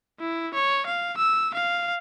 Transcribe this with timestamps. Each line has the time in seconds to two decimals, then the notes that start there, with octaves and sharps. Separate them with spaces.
0.20 E4
0.54 C#5
0.86 F5
1.17 E6
1.54 F5